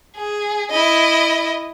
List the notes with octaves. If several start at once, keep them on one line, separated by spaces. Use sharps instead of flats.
G#4
E4 D#5